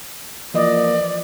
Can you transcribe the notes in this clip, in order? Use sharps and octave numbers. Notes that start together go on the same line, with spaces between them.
E3 F3 A#3 D5 D#5